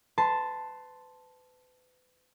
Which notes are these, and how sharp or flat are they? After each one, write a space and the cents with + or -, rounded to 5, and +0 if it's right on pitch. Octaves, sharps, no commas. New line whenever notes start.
B4 +35 A5 +0 C6 +0